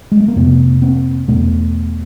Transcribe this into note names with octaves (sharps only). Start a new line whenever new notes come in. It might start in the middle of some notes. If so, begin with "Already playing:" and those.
G#3
A3
A#3
F2 C3 A3 B3
A#3 C4
E2 B2 A3 B3